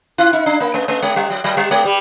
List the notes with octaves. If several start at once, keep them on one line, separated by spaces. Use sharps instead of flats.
E4
D#4
D4
A#3
A3
A3
G#3
G3
F#3
F#3
G3
G#3
G3